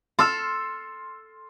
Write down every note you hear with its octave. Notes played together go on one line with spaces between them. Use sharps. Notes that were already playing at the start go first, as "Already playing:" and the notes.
A4 C6 E6 F6